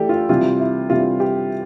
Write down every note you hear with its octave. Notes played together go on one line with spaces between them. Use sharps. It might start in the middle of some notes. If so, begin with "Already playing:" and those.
Already playing: E3 A3 D4 G4 A4
F4
C3 E3 G3 F4
E4
C3 E3 G3 F4
G4